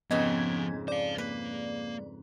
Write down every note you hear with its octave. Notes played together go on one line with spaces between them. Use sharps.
F2 G#2 C#3 F3 B3 D#5 F#5 G#6
C5 D5 F5
A#3 B4